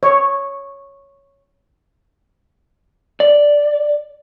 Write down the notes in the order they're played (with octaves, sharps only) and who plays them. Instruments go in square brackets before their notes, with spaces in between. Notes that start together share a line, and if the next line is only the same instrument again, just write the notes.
[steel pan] C#5
[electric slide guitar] D5